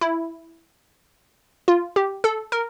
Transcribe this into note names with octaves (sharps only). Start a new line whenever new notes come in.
E4
F4
G4
A4
A#4